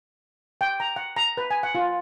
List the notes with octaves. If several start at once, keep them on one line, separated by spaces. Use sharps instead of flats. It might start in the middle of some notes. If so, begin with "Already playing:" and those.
G5
A#5
F#5
A#5
B4
G#5
F#5
F4